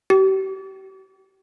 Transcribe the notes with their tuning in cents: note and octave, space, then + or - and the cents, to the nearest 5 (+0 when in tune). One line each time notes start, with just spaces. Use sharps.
G4 -40